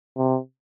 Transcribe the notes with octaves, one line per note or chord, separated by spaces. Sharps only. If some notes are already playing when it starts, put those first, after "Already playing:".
C3